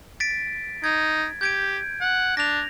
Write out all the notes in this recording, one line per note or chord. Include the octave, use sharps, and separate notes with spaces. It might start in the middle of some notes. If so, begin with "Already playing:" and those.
A6 B6 D7
D#4 G#6
G4 G6 G#6 D7
F#5
D4 A#6 F7